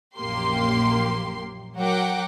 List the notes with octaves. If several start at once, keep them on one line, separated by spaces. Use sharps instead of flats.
A#1 F#2 A#3 G4 C6
F#3 A#4 F#5 G5 D6